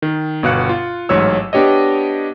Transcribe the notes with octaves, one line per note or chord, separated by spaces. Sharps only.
D#3
G1 B2 F5 F#6 C#7
F4
A1 G#2 F#3 C#5 E6
B3 D4 G4 C#5 D#5